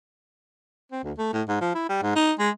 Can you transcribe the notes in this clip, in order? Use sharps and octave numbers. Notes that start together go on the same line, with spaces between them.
C4
D2
A3
A2
G#2
F3
E4
G3
G#2
D#4
G#3